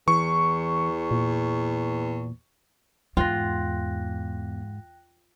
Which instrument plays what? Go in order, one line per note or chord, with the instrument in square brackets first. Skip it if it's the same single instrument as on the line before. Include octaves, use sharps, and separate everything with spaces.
[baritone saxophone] E2 [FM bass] E3 [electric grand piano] C#6
[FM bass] A#2
[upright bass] E2 [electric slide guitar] G#2 [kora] F4 [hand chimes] G5 F#6 A#6